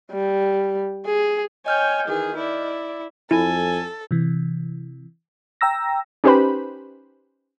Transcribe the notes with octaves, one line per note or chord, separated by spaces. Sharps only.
G3
G#4
C#5 D#5 G5 G#5 F6 G6
D#3 E3 G#4
E4 D5
F2 E4 A4 G#5
C3 E3
G5 A#5 E6 A#6
C#4 D#4 G4 B4 C5 B5